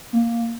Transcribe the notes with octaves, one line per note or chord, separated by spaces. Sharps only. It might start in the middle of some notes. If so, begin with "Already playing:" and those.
A#3